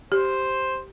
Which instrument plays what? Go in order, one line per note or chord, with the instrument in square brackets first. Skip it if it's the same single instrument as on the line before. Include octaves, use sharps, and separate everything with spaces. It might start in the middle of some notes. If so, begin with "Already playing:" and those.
[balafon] G4 [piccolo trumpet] C5